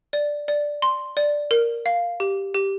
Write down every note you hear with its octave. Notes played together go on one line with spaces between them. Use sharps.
D5
D5
C6
D5
A#4
F5
G4
G4